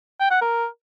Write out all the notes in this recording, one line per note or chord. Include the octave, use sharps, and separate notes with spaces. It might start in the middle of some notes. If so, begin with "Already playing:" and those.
G5
F#5
A#4